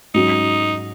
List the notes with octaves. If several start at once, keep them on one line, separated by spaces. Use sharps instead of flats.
G#2 F#3 C#4 D#4 F#4